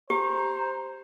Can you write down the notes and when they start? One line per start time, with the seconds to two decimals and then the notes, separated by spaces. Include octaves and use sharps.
0.10 G4 C5 A#5